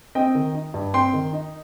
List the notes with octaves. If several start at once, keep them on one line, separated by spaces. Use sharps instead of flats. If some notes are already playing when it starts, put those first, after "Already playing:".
C4 D#5 G5
D#3
D#4
G2
C4 G5 C6
D#3
D#4